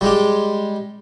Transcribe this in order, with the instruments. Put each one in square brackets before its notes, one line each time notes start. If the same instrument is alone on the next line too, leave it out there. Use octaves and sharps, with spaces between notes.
[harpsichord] G3 G#3 G4